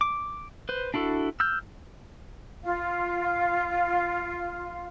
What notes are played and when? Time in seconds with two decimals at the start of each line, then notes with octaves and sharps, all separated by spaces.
0.01 D6
0.69 B4 C5
0.94 D4 E4 F#4 A4
1.40 E6 F6 G6
2.63 F4 F5